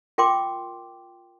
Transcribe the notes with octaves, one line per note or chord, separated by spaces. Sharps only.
F4 A#4 G5 C6 D6